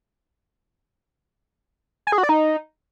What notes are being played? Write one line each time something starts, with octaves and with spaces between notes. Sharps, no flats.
G#5
G#4
F#4
D5
D#4